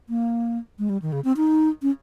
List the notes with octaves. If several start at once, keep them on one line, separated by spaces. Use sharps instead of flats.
A#3
G#3
G3
D#3
C#3
C4
D#4
C#4